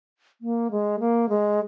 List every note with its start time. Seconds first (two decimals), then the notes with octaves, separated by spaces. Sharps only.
0.41 A#3
0.71 G#3
1.00 A#3
1.29 G#3